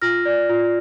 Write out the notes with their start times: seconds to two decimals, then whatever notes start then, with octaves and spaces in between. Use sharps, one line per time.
0.02 F4 F6 A#6
0.25 D5
0.49 F4